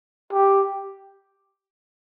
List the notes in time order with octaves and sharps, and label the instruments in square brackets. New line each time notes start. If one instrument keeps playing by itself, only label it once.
[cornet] G4